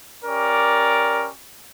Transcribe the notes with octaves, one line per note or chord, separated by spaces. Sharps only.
C#4 G4 A#4 D5